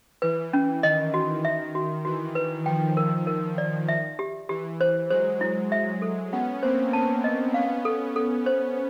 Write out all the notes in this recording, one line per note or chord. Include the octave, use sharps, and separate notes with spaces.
E3 B4
C#4
D#3 D#5
F#4
E5
F#4
E3 F#4
B4
D#3 F3 G5
A#4
A#4
D5
E5
G4
E3 G4
C5
F#3 G#3 C5
E4
E5
A4
B3 C#4 F#5
A#3 C4 C5
B3 C#4 A5
D#5
B3 C#4 F5
A4
A4
C5